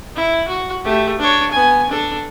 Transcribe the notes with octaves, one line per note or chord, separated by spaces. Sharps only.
E4
F#4
A3 G4
D4 C#5
B3 G#5
D4 A4